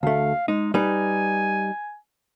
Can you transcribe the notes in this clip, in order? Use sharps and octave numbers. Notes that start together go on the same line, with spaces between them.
D2 A3 F5
G#3 D#4
G3 D#4 B4 G#5